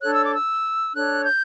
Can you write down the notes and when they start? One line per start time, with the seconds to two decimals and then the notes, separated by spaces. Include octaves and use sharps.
0.02 D4 A4 C#5 F#6
0.13 E6
0.25 D6
0.36 E6
0.94 D4 A4 C#5 F#6
1.24 G6